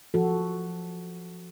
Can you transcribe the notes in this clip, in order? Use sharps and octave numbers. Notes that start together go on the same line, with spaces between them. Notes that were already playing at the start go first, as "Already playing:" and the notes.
F3 F#4 A4